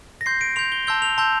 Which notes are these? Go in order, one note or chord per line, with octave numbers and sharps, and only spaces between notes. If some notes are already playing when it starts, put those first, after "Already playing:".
A#6
C6 G6 C7
D7
C6 G6 F7
G7
A5 C6 E6 G6 G7
F7
A5 C6 E6 G6